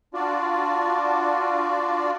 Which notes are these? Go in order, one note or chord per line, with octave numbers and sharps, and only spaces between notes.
D4 F4 F#4 D5